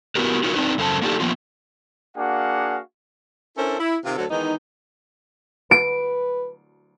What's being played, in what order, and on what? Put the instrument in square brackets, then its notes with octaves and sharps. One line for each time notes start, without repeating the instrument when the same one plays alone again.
[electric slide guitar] B3 E4 F#4 G4 A#4 B4
D#4 F4 F#4 A#4 C#5
C4 D4 D#4 B4
F#2 C#3 A4 C5 G#5 A5
A#3 D4 D#4 G4 A4
F3 A#3 B3 F4
[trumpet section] A#3 D4 F#4 G#4 F5 F#5
[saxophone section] C#4 D4 E4 A4 A#4 C5
E4
C3 D#3 C4 F4
D2 F#3 F#4 A4
D#3 E3 G#3 B3 D#4
[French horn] B4 [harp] D7